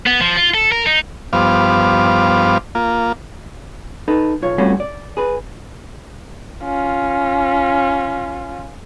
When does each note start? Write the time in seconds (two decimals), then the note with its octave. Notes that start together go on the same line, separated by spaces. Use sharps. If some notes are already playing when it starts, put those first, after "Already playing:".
0.06 B3
0.21 F3
0.37 F4
0.54 A4
0.72 A#4
0.86 D#4
1.33 G2 F3 B3 C5 F5 D6
2.75 A#3 F4
4.08 D#4 A4 B4
4.42 B1 F4 C#5
4.58 G3 A3 C4 C#4 F4 F#4
4.80 D5
5.17 G#4 B4
6.64 C#4 F4